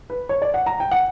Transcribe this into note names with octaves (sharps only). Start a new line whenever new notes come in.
B4
C#5
D5
F#5
A#5
G5
F#5